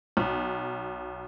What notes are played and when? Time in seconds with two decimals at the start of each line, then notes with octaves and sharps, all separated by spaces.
0.17 B1